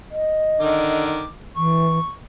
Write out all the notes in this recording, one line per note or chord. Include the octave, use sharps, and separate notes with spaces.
D#5
D3 D#3 D6
E3 C#6